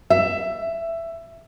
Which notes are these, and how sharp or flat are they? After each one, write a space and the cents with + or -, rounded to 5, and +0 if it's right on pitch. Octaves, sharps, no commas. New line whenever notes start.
E5 +15